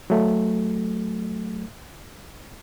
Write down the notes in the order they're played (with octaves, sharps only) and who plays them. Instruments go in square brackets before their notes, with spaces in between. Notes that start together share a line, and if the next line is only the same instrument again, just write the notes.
[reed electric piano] F#3 A3